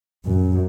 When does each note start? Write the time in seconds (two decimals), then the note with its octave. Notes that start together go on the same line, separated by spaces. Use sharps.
0.25 F#2